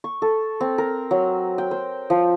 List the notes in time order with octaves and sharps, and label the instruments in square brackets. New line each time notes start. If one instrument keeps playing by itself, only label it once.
[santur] C#6
A4
C4
A#4
F#3
G5
C5
F3